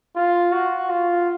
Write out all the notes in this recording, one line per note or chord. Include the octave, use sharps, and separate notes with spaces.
F4
F#4
F4